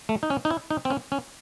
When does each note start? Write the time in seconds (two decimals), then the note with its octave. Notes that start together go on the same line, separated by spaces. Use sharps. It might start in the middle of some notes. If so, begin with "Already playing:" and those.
0.09 A3
0.23 D#4
0.30 C#4
0.45 D#4
0.50 E4
0.71 D#4
0.85 C4
0.90 C#4
1.12 C#4